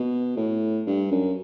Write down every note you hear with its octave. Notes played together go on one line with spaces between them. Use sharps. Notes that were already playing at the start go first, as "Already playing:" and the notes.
Already playing: B2
A2
G2
F#2